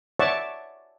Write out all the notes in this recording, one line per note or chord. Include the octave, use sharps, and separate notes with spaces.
C#5 D5 E5 F#5 A5 C#6